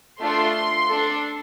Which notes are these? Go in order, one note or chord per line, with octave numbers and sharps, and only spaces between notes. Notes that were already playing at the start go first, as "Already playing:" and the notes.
A3 D4 F4 A4 C6
D4 A4